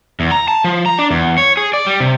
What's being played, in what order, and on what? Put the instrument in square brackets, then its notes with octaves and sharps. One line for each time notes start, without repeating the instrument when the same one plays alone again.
[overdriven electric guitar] E2
A#5
A5
F3
A#5
D4
E2
C#5
G#4
D5
G3
C3